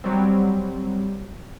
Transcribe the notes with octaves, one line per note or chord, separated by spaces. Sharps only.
F#3 G3 C4